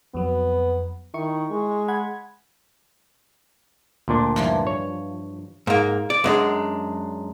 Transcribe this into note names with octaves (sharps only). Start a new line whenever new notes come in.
F2 F#3 B3
D#3 E4 C#6
G#3
F#5 B5 G#6
D2 A#2 D4
G2 E3 F3
C#5
G#2 A#3
D5
F#2 G#3 D4